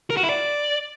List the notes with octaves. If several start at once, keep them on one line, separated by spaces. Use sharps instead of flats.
A#4
F#4
E4
D5